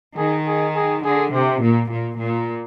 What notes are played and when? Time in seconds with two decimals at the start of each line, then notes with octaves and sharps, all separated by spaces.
0.17 D#3 G#4
0.46 G#4
0.75 G#4
1.05 D3 G#4
1.34 C3 G4
1.63 A#2
1.93 A#2
2.22 A#2